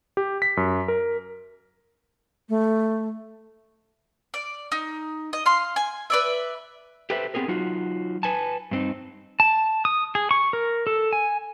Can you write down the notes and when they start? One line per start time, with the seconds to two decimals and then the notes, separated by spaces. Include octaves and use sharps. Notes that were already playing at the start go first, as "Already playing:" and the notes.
0.17 G4
0.42 B6
0.57 F#2
0.88 A#4
2.49 A3
4.34 D5
4.72 D#4
5.33 D#5
5.46 F5 C6
5.76 G#5
6.10 B4 D5 E5
7.10 G4 A4 B4 C5 E5
7.34 B3 C4 G4 G#4 A#4
7.48 F#3 D#4 F4 F#4
8.23 B4 G#5 A5
8.71 G2 C4 D#4
9.40 A5
9.85 D#6
10.15 G#4
10.31 C#6
10.53 A#4
10.87 A4
11.13 G#5